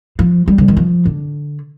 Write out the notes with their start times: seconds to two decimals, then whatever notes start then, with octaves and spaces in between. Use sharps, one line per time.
0.19 F3
0.48 G3
0.58 D3
0.68 D#3
0.77 F3
1.05 D3